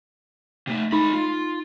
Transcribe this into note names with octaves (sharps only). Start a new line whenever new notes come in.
C3 A3
G#3 D#4 B5
F4